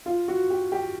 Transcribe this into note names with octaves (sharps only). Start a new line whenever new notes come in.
F4
F#4
G4
G4